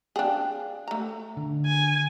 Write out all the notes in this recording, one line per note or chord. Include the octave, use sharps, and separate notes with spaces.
D4 G#4 F5 G5
A3 A#5
D3
G#5